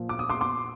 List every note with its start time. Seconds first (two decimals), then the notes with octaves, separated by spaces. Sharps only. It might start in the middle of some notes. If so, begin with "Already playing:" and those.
Already playing: A#2 F3
0.09 D6
0.19 D#6
0.30 C6 D6
0.41 C6 D6